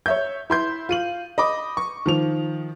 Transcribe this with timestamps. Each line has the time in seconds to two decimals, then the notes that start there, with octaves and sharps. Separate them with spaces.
0.06 C#5 E5 G6
0.50 E4 C6 G6
0.89 F4 D#7 F#7
1.38 D#5 B5 D6
1.77 C#6
2.06 D#3 F3 F7